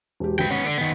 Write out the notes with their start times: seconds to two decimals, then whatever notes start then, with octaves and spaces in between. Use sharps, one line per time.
0.20 E1 G4
0.39 G#1 B4 G5
0.51 B3 C#4 F#5
0.66 D3
0.78 D#3 B3